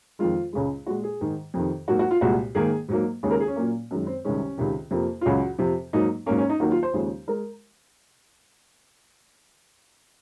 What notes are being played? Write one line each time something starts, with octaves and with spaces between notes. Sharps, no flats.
F2 D#3 G#3 F4
C#2 C#3 G#3
A#2 G#3 F#4
G#4
G#2 D#3 G#3
F2 C3 D#3
G#2 F#3 A#3 F#4
F#4
F4
C2 A#2 G#3 F#4
G#2 D#3 A#3 G#4
G#2 F#3 A#3
D#2 C#3 G#3
A#4
G#4
C#4
A#2 F#3 A#3
F#2 D#3 G#3
C4
C2 C3 D#3 G#3 C#4
C#2 C3 D#3
F2 C3 F3 A#3
F4
C#2 C#3 F#3 F#4
F2 C3 F3
G#2 F#3 A#3 D#4
G#2 F#3 A#3 C#4
C#4
D#4
D#2 D#3 F#3 A#3 F#4
F4
C5
D#2 C#3 F3 G#3
G#3 A#4